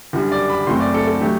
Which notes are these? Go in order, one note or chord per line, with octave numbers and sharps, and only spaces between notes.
F#1 F#2 D3 G3
D5
B5
F#1 F#2 F#3 A3 C4 C6
D5
A4
A4
F#3 A3 G4